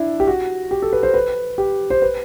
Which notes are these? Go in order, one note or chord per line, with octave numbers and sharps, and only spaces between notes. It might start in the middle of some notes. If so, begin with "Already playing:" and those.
Already playing: D4 E4
G4
F#4
G4
A4
B4
C5
B4
G4
C5
B4